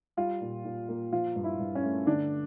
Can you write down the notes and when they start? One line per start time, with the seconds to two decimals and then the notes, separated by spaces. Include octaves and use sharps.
0.17 G3 F4
0.41 A#2
0.65 A#2
0.89 A#3
1.12 F3 F4
1.36 G2
1.44 E4
1.60 G2
1.75 C#4
1.84 A3
2.07 D3 D4